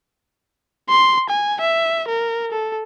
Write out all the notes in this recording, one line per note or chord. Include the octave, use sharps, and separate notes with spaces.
C6
G#5
E5
A#4
A4